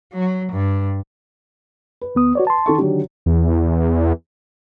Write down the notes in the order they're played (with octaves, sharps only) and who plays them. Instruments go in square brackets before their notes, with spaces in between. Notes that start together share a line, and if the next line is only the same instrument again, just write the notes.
[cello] F#3
G2
[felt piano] B4
[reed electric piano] D2 B3 D#6
F#4 C#5 D5
A5 C6
[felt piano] D#3 A4 C#6
[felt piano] D3 D#3 F#3 [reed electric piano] D4 G4
[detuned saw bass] E2